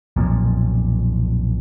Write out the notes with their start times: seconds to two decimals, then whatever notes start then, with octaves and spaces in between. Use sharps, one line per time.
0.16 B1 F2 A#2